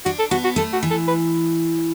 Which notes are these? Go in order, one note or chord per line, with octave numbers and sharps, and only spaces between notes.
D4 F#4
A4
B3 F#4
F#4
A3 A4
F#4
E3
A4
B4